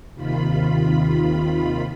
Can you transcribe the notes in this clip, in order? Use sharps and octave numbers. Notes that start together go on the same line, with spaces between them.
D#2 C3 D#3 F4 B5